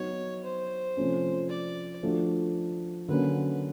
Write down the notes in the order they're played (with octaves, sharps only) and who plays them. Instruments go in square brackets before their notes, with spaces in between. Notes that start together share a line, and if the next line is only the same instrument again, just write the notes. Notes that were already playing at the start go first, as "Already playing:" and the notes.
Already playing: [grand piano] F#3 B3 D#4 [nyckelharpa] C#5
[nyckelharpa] C5
[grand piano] C3 F3 A3 C#4
[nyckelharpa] D5
[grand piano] F3 A3 D4 F#4
[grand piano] D3 F#3 A#3 C#4 [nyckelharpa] B4